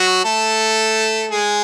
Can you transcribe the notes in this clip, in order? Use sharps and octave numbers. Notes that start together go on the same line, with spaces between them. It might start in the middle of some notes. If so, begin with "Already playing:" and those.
Already playing: F#3 F#4
A3 A4
G#3 G#4